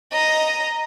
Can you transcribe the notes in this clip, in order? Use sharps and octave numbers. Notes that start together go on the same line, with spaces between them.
D#5 A#5